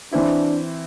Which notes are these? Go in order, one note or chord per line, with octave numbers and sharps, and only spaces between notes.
E3 C4 D4 E4